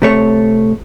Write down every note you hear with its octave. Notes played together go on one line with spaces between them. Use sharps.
C3 A3 C#5